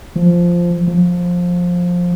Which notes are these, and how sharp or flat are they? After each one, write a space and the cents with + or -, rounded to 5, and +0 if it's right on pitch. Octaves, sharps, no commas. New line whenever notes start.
F3 -5
F3 +15